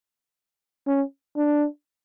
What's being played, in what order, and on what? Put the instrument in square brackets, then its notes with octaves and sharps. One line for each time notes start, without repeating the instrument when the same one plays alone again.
[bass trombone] C#4
D4